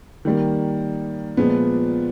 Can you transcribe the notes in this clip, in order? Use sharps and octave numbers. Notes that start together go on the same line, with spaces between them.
D#3 G3 A#3
A#2 F3 G#3 B3